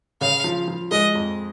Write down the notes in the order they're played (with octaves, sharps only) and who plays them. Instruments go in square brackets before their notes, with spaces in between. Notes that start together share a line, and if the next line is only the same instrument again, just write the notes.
[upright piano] C#3 [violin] F5
[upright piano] F3
F3
[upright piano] G#3 [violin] D#5
[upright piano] F2